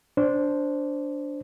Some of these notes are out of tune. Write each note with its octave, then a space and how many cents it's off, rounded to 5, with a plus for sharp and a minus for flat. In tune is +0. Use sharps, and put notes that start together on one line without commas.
D4 -10 C5 +0